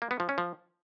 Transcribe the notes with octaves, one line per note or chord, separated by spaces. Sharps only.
A#3
B3
F3
C#4
F3